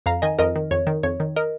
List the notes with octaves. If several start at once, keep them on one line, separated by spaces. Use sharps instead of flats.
F2 F5 A#5
D#3 D#5 G#5
F2 A#4 D#5
D#3
F2 C#5
D#3
F2 C#5
D#3
A#4 D#5